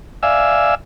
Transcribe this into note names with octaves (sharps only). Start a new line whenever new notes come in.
D5 E5 F5 G#5 E6